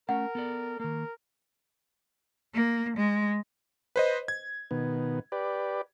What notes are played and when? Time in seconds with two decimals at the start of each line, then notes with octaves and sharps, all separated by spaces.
0.09 A3 C#4 A#4 F#5
0.35 B3 A4 D5
0.80 D#3 A#3 A#4
2.54 A#3
2.97 G#3
3.96 B4 C5 D#5
4.28 G#6
4.71 B2 D#3 B3
5.32 G4 B4 D5